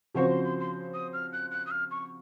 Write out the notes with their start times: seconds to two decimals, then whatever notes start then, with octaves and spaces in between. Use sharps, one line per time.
0.15 C#3 F3 C4 F#4 C5 C#6
0.30 C6
0.44 C6
0.60 C6
0.94 D#6
1.13 F6
1.33 F#6
1.51 F#6
1.67 D#6
1.71 F6
1.91 C#6